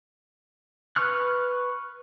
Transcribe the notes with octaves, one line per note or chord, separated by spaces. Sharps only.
B4 C#6 F6 F#6